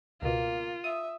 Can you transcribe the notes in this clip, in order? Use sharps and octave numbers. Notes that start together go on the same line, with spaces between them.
C#2 B2 A#3 F4
E5 D#6